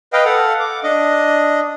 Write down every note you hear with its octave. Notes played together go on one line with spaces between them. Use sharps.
B4 D#5 F5 G5
A4 F5 F#5
D6
D4 D#5